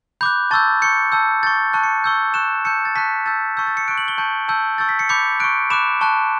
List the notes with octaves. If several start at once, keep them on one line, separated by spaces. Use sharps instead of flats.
B5 D6 F#6 G6
A5 C#6 E6 G6 A6
C#6 G6 C#7
A5 E6 G6
C#6 G6 A6
A5 C#6 F#6
C#7
C#6 E6 G6
C#6 F#6 E7
A5 E6 G6 C#7
A6
A5 C#6 F#6 B6
A5 E6 G6 A6
A5 C#6 E6 G6
A6
C#7
C#6 F#6 D7
F#7
G7
A5 C#6 G6
A5 E6 G6
C#6 E6 G6 A6
B6
C#7
B5 D6 G6 C#7
C#6 F#6 D7
B5 D6 F#6 E7
A5 C#6 F#6